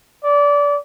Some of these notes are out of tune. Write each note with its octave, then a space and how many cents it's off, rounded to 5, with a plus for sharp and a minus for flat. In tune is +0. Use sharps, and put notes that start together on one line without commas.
D5 -25